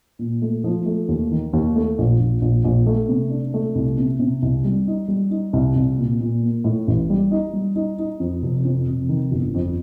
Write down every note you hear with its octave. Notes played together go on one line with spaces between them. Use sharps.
A#2
A3
F3
A3
D#2
D#3
D#2
A3
A#1
A#1
A#1
A#1
A3
C3
D4
A3
C2
C3
C3
C2
G3
D#4
G3
D#4
C2
C2
A#2
A#2
A#3
A2
A1
G3
D#4
G3
D#4
D#4
F2
F1
F2
F1
D#3
G1
F2